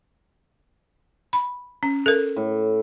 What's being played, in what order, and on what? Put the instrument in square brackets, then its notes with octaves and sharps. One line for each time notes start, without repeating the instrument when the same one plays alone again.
[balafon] B5
C#4
A4 A#4
[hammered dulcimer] A2